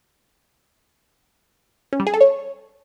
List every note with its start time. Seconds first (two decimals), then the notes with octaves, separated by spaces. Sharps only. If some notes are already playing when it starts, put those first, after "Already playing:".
1.93 C#4
2.00 G3
2.07 G#4
2.14 A4
2.21 C#5